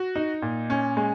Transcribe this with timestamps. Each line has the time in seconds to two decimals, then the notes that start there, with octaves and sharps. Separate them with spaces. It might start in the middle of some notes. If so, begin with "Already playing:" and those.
Already playing: F#4
0.16 D#4
0.42 A#2
0.70 C#4
0.97 G#3